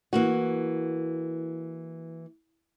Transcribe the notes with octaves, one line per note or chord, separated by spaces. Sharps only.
E3 A#3 F#4